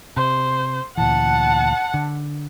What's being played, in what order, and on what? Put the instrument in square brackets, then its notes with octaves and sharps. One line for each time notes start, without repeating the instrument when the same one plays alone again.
[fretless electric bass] C3 [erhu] C5
[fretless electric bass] D2 A#2 E3 [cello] F#5 [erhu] A5
[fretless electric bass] D3